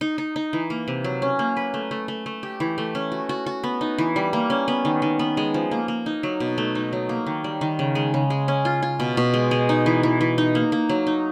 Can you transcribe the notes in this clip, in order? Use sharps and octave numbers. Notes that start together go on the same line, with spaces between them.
D#4
D#4
D#4
E3
A#3
C3
F#3
C#4
A#3
B4
A3
A3
A3
A3
G4
E3
A3
C#4
F#4
F#4
F#4
B3
D#4
E3
G3
A#3
C#4
B3
D#3
D#3
B3
G#3
F3
A#3
A#3
D#4
F#3
B2
A3
D#4
F#3
A#3
D#3
G3
D#3
C#3
G#3
C#3
G#3
C#4
F4
F4
B2
B2
G#3
G#3
D#4
E3
E3
E3
D#4
A#3
A#3
F#3
D#4